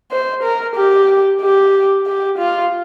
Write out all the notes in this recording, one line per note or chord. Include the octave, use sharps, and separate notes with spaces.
C5
A#4
G4
G4
G4
F4